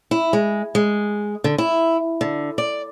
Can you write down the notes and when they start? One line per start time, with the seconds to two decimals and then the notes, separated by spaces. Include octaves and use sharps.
0.11 E4
0.33 G#3
0.75 G#3
1.44 D3
1.58 E4
2.21 D3
2.58 D5